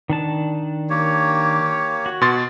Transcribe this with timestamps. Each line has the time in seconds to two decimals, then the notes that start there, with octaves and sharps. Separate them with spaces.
0.09 D#3 D4 A5
0.90 A#3 G4 C#5
2.06 F#4
2.21 B2 C6 A6